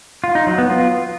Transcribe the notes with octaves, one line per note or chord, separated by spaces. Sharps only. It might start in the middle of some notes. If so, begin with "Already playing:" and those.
F4
D#4
F#3
B3
F4